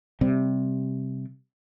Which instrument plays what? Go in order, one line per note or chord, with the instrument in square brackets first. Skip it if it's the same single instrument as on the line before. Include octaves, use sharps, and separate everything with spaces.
[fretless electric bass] C3 G3